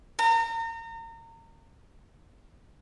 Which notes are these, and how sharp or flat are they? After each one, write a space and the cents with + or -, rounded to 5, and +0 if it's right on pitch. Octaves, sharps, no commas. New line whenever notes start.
A#5 -35